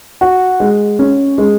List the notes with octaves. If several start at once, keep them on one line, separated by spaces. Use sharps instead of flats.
F#4
G#3
C#4
G#3